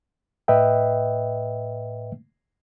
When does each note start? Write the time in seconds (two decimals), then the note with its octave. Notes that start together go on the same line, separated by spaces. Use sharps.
0.48 A2 B4 D#5 E5 G5